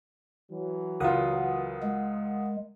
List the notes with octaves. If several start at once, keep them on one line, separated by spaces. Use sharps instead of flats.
E3 F#3
C#2 F4 A#4 F#5 D#6
G#3